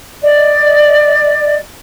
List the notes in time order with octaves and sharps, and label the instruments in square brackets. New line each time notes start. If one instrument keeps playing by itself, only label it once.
[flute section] D5 D#5